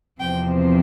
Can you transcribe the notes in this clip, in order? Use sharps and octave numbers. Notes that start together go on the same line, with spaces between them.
E2 C3 F3 C4 G5